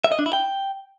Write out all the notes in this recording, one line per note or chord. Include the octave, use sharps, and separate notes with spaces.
E5
D#5
D4
E4
G5